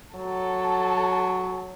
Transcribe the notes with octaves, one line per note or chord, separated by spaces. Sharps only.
F#3 A4